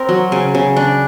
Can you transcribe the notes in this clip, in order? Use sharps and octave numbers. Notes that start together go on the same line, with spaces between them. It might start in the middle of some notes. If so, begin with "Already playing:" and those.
Already playing: C4 A#4
F#3
C#3
C#3
D4